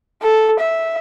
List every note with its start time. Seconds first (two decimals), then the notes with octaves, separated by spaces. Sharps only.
0.22 A4
0.60 E5